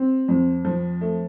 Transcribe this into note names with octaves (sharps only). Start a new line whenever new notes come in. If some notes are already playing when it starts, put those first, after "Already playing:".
Already playing: C4
F2
F3
A3